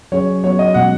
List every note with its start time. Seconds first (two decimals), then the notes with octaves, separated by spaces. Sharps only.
0.12 F#3 C#4 G#4 C#5
0.44 F#3 B3 F#4 C#5
0.59 D#5
0.74 B2 G#3 C#4 F#5